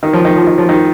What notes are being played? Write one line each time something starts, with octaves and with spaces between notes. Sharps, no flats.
D#3
F3
D#3
F3
D#3
F3
D#3